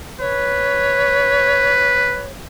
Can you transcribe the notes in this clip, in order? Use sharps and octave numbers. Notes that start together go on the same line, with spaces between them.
B4 C#5